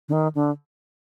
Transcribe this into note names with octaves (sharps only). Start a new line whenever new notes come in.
D3
D#3
D3